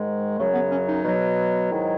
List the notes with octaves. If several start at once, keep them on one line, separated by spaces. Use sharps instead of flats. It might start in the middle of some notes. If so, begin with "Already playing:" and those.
Already playing: G#2 D#3 G#3
F#2 C#3 F#3 A3
B3
C#4
D#4
B2 F#3
G#2 D#3 F#3 E4